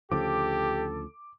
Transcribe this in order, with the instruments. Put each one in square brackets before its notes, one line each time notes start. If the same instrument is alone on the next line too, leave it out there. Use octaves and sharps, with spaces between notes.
[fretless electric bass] D2 C#3 F3 [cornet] G4 [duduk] A4 [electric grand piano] D6